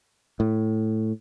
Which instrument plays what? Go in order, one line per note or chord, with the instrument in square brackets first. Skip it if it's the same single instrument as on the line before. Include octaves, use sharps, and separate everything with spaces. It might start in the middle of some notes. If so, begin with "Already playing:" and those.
[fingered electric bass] A2